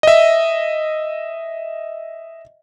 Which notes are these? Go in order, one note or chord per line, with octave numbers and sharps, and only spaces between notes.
D#5 E5